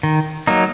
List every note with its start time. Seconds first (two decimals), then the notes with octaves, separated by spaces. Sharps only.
0.03 D#3
0.47 F#3 A#3 D#4